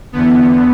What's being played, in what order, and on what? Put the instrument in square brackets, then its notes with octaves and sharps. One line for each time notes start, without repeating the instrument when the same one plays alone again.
[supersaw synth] E2 D3 B3